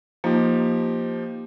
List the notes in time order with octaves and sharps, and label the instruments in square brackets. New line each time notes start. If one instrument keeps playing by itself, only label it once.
[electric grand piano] F3 D#4 G4 [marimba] A#3